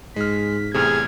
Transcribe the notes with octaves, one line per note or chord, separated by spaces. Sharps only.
G#2 G#3 F6 B6
E2 A2 C3 G#4 F6 G#6